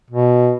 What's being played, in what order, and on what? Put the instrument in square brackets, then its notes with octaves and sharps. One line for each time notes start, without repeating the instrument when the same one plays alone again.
[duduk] B2